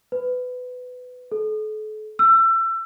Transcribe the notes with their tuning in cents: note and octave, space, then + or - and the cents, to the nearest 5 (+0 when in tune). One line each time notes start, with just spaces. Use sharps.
B4 +20
A4 -40
E6 +30